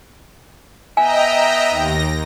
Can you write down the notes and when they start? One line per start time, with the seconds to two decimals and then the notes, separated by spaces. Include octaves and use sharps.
0.97 B3 D#5 E5 G5 G#5 A#5
1.69 D#2 A#6